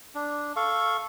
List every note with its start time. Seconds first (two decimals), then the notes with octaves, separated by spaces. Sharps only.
0.15 D4
0.56 A4 F5 C#6